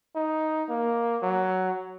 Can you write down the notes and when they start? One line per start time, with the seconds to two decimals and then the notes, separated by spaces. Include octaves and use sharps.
0.16 D#4
0.69 A#3
1.22 F#3